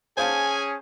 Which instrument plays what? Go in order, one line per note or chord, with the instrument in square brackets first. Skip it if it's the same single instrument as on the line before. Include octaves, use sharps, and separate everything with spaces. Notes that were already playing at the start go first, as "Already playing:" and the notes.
[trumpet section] C#4 G#4 [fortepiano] C5 F5 A5 [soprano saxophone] G#5